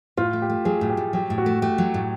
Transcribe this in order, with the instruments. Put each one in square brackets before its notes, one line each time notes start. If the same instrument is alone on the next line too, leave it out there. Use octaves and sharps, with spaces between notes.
[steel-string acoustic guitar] A2 [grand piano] F4
[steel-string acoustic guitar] A3
[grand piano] G4
[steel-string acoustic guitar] A3
[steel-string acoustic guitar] F#3 [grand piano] G#4
[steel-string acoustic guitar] A2
[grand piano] G4
[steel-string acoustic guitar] A2
[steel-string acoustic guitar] F#3 [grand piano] G4
[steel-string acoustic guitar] A2
[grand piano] F#4
[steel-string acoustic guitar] A3
[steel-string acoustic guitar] A3 [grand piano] G4
[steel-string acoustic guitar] F#3
A2